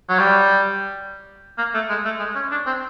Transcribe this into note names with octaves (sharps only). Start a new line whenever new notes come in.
F#3
G3
A#3
A3
G#3
A3
G#3
C#4
D4
C4